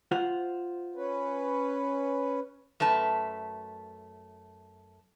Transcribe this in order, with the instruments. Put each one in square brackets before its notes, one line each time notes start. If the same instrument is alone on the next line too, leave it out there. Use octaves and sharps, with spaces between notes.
[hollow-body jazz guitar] F4 C5 F#5
[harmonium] C#4 B4
[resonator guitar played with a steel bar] F#2 A3 B4 A5